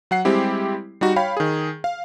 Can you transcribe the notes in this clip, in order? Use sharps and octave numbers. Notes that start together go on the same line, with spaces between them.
F#3 F#5 C7
G3 G#3 C4 E4 G4
G3 D#4 F#4
C#5 F5 G5 B5
D#3 G#4
F5